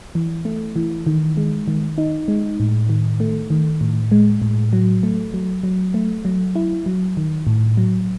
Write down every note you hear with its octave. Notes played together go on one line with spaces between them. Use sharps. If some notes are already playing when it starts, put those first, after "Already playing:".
E3
A3
E3
D#3
G#3
D#3
D#4
G#3
A2
D#3
A3
D#3
A2
G#3
A2
F#3
A3
F#3
F#3
A3
F#3
E4
F#3
D#3
A2
F#3